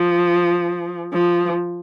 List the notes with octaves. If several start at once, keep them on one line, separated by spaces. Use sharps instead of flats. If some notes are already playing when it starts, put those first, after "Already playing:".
Already playing: F3
F3